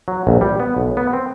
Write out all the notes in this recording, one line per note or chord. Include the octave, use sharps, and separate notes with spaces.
F#3
A#1
G3
B3
B1
B3
C4